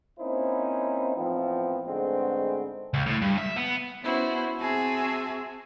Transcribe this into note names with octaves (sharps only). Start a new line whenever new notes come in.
A#3 C4 C#4 D#4 E4 C5
A1 F3 B3 C4
G#2 D3 G#3 A3 B3 C4
C#2
A2
G2
E5
B3
B3 C#4 E4 F#4 C5
C4 F#4 G#4 E5 G#5 A5